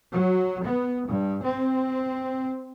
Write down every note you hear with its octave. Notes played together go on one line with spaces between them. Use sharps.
F#3
B3
G2
C4